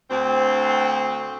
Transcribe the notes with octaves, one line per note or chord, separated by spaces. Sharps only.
D2 C4